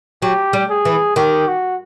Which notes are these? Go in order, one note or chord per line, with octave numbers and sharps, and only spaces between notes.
F#3 G4
G3
G#4
E3
D#3 G4
F#4